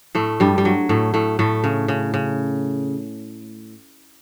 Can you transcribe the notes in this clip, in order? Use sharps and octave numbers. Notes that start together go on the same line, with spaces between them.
A2 A3
G2 G3
G3
F#3
A2 A3
A2 A3
A2 A3
C#3
C#3
C#3